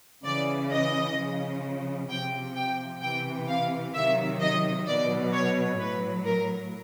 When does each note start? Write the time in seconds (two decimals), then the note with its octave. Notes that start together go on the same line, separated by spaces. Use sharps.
0.25 C#3 E3 D5
0.71 D#5
1.17 C#3 F3
2.10 C3 F3 G5
2.56 G5
3.02 C3 E3 G5
3.48 F5
3.94 C3 D#3 F#3 E5
4.41 D#5
4.87 B2 F#3 D5
5.33 C#5
5.79 A2 F#3 B4
6.25 A#4